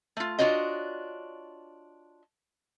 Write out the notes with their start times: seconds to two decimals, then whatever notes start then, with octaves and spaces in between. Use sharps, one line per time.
0.17 A3 F4
0.39 D4 F4 F#4 C#5 D#5